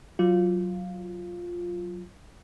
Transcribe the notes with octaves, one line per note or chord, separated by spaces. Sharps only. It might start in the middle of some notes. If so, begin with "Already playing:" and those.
F#3 F4